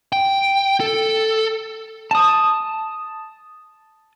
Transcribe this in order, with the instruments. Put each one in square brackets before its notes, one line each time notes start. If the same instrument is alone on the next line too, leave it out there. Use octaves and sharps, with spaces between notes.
[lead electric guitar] G5
A4
[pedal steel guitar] A5 D#6